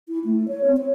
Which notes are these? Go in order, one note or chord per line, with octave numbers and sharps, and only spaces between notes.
E4
A3
C#5
C4
C#5